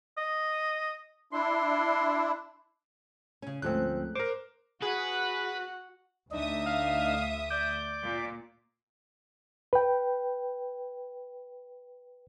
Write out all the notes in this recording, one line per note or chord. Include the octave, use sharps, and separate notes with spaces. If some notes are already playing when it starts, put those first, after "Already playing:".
D#5
D4 E4 C6
C#3 C#4
D2 G#2 F3 A3 C4 C#4 F#6
A#4 C5 D6
F#4 G#4 B4 F#5
D2 D4 D#4 D#5 E5 D#6
F5
D5 D6 G6
A#2
B4 G5